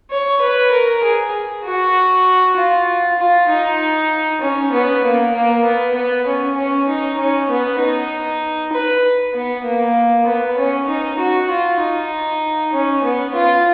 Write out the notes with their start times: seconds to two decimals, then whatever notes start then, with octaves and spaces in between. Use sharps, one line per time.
0.10 C#5
0.41 B4
0.71 A#4
1.03 G#4
1.64 F#4
2.57 F4
3.19 F4
3.49 D#4
4.41 C#4
4.72 B3
5.03 A#3
5.34 A#3
5.64 B3
5.95 B3
6.27 C#4
6.57 C#4
6.88 D#4
7.19 C#4
7.49 B3
7.80 D#4
8.72 B4
9.34 B3
9.64 A#3
10.26 B3
10.58 C#4
10.88 D#4
11.18 F#4
11.50 F4
11.80 D#4
12.72 C#4
13.03 B3
13.34 F4